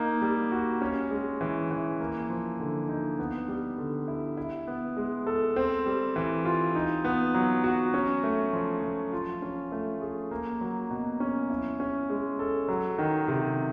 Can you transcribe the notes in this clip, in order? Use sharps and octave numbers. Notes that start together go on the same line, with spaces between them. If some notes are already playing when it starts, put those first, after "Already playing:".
Already playing: A#3 D#4
G3
F#4
C#4
G#3
E3
E3
A#3
F3
D3
D#4
B3
G3
D3
E4
E4
B3
G#3
A4
C4
G3
E3
F4
D#4
B3
F#3
F#4
C#4
A3
F3
F3
F4
C#4
A3
G#4
A#3
F#3
B2
C#4
E4
C#4
G#3
A4
F#3
D#3
C3